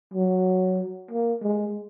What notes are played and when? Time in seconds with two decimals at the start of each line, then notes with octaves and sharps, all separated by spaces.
0.14 F#3
1.11 A#3
1.42 G#3